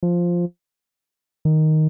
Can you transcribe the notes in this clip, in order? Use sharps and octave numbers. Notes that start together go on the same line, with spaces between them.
F3
D#3